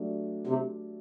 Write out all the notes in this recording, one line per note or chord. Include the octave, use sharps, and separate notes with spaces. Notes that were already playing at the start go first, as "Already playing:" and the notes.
Already playing: F#3 A3 D4 G4
C3